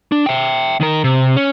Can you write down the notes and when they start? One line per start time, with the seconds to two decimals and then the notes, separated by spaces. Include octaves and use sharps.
0.12 D4
0.26 E5 G5
0.81 D#3 A#4
1.04 C3
1.36 C#4